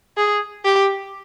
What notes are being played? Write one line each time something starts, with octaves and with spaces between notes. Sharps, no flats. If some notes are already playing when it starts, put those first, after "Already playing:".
G#4
G4